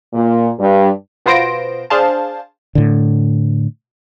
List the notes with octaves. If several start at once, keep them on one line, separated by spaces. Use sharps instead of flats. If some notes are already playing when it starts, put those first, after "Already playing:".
A#2
G2
B2 B3 F4 C5 A#6 D7
D4 G#4 C5 F5 A5
A2 D3